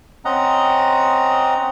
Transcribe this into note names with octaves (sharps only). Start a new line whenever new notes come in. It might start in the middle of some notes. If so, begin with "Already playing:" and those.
C4 C#4 D#5 F#5 A#5